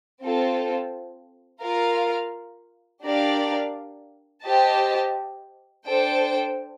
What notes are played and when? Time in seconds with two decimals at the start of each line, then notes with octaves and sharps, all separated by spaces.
0.21 C4 F4 A4
1.61 F4 A#4 F5
3.03 D4 G4 A#4 D5 F5
4.45 G4 C5 D#5 A5
5.87 D4 A4 C5 G5